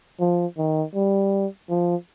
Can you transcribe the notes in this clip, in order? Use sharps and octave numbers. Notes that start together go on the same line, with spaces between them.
F3
D#3
G3
F3